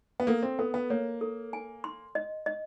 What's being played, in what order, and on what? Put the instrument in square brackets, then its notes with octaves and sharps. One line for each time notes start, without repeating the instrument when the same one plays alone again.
[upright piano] B3
[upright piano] A#3 [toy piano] A4
[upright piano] C4
[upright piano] B3 [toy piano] A4
[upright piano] B3
[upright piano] A#3 [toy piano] C#5
[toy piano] A4
G#5
C6
D#5
D#5